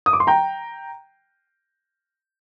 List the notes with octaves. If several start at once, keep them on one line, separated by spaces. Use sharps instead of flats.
D#6
D6
C6
G5 A#5